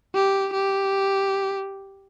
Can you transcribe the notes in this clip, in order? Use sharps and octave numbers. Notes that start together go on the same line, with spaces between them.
G4
G4